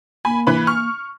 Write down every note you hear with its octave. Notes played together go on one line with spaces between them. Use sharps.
A#3 G#5 B5
E3 B4 B5
C#6 F6